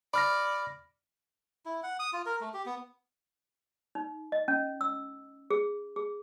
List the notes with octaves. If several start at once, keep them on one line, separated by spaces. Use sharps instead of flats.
D5 B5 F6 A#6
E4
F#5
D#6
F4
A#4
A3
G4
B3
D#4
D#5
C#4
E6
G#4
G#4